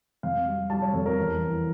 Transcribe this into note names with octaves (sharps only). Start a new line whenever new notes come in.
F2 F5
G3
G3 A5
C#5
F2 A4
A#4
E2
E3